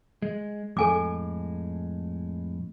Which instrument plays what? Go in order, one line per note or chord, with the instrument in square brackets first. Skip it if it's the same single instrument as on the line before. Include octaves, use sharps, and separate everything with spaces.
[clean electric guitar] G#3
[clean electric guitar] F2 A2 G#3 [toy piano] A4 G#5 D6